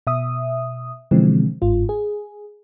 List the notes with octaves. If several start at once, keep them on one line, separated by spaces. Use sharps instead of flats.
B2 E5 D#6
B2 D3 E3 F3 G#3 C4
G1 G#2 F4
G#4